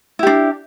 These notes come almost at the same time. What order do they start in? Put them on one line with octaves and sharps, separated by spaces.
E4 G4 D4